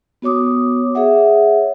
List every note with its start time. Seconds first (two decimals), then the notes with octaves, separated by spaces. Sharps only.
0.22 B3 F#4 C#5 D6 D#6
0.95 G#4 C#5 E5 F#5